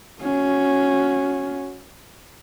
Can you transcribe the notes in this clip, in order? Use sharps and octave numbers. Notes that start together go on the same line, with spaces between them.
C#4 F#4